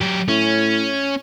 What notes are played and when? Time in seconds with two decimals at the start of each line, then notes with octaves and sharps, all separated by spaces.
0.01 F#3 G4
0.28 A2 C#4